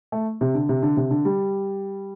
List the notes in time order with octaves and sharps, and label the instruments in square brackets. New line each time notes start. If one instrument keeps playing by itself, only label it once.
[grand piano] A3
C3
D3
C3
D3
C3
D3
G3